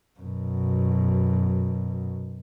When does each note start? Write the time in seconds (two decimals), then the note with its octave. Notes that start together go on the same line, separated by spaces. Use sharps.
0.20 F#2 B2